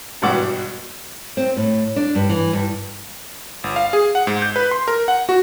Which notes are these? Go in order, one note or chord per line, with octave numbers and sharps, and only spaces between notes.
G#1 G2 B2 E3 F#5 D6
C4
A2
D4
G2
E3
G2
G1
F5
G#4
F#5
G#2
G6
B4
C6
A#4
F#5
F#4